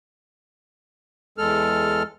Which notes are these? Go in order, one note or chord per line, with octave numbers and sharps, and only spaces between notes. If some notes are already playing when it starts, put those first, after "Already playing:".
E2 G#3 A4 F6